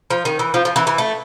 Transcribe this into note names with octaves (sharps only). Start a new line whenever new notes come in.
F3
D#3
E3
F3
F3
E3
E3
A3